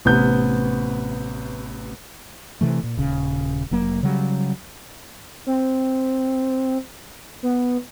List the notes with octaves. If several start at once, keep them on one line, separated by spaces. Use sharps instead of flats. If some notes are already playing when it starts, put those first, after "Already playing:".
A1 C3 B3 G6
C3 E3 A3
A#2
D#1 C#3
F1 F#3 A#3
C#3 F#3 G3
C4
B3